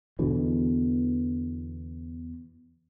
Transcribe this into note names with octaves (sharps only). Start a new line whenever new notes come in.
E2 B2 D3 E3